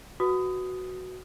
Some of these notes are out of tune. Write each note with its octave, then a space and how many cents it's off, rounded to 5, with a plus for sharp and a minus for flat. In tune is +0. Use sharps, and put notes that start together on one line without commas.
F#4 +0 B4 +0 D#6 +0